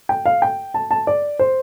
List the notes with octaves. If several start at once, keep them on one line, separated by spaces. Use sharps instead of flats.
G5
F5
G5
A5
A5
D5
C5